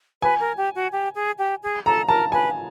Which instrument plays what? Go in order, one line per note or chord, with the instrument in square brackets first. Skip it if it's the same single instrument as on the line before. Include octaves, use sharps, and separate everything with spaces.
[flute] B4 [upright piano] G#5
[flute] A#4
G4
F#4
G4
G#4
G4
G#4
[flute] A4 [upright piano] A#5
[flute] A#4 [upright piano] A5
[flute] B4 [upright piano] G#5